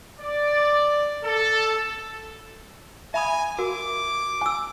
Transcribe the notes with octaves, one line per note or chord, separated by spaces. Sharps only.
D5
A4
E5 G#5 B5 D#6
F#4 A#4 D6
G#5 E6